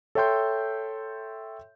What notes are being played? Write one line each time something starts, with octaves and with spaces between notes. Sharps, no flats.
A4 C#5 E5 G5 C6 G6